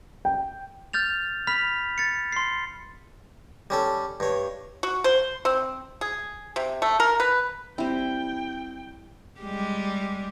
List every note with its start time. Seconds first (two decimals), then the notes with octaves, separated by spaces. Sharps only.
0.25 G5
0.93 F6 G6 A6 F7
1.47 B5 F6 B6 F7
1.98 A6 C#7
2.32 C6 C7
3.70 G3 C#4 A4
4.20 G2 C#5
4.83 F#4
5.04 C5
5.45 C4
6.01 G#4
6.56 C3
6.82 A3
7.00 A#4
7.20 B4
7.78 G3 C4 E4 G5
9.41 G3 G#3 G4